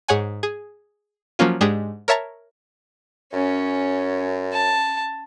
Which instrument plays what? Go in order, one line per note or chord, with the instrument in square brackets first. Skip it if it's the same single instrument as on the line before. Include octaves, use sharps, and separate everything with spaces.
[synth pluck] G#2 G#4 C#5 F#5 G#5
G#4
F3 F#3 A#3 C#4 F4
G#2 G#3 D4 G4 G#4
A#4 C#5 E5 A5 A#5
[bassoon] F#2 [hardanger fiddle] C#4
[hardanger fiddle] A5